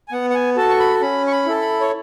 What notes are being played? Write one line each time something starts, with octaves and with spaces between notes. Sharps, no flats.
G#5
B3 F#5
F#5
G#5
F#4 A4 A5
C#6
B5
C#4 B5
C#6
B5
E4 A4
B5
C#5